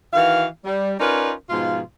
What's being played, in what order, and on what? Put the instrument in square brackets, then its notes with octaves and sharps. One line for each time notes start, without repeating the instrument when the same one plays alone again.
[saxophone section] D#3 E3 F#4 F5
G3
C#4 D#4 F4 A#4 B4 D5
G#2 B2 F3 F4